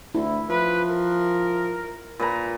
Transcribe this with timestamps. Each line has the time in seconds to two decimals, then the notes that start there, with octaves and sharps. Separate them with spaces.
0.15 D2 E4
0.50 F3 B4
0.90 A#4
2.20 A#2 B4 A#5